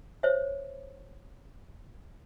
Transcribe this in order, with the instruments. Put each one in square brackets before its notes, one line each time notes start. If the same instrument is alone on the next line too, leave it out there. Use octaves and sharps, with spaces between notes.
[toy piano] C5 C#5 E5